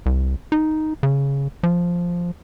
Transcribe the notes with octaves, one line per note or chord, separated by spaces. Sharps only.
C2
D#4
C#3
F3